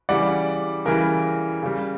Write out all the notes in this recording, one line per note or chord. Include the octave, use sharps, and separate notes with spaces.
C#3 E3 G3 D5 F#5
C#3 E3 G3 A#4
C#3 G3